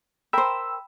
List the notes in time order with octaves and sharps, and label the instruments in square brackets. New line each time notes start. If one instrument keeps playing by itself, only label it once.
[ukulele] A#4 C5 [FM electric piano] G5 B5 E6